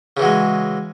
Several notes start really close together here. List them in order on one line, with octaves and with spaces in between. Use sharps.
C#3 E3 F#3 G#3